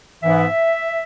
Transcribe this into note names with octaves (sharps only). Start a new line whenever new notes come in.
G#2 E3 B3 E5